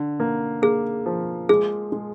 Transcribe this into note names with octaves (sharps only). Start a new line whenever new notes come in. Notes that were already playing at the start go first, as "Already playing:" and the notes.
Already playing: D3
A#3
A#3 G#4
F3
G#3 G#4
G#3